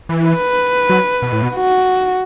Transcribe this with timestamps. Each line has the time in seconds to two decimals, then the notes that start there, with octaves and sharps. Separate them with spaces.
0.09 E3
0.26 B4
0.90 F#3
1.22 B2
1.32 A2
1.42 B2
1.55 F#4